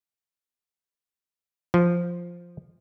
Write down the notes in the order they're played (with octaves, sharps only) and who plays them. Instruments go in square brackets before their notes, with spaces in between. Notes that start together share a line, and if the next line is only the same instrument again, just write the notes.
[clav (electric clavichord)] F3